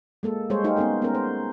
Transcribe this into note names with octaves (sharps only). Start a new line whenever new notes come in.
G#3 A#3 A4
G3 G#3 G#4 C5 C#5
A3 D#4 G4 G#4 C5 F5
B3 C#4 D#4 G#4 A#4
B3 C#4 A#4
C5